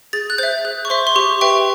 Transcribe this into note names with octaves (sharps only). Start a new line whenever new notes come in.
G#4 A6
F#6
C5 E5 G6
G#4 F#6
C#6
C5 E5 C6
C6
G4 C#6
B4 E5 G5 C#6